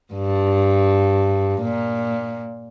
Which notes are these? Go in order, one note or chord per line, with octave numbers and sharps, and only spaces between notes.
G2
A#2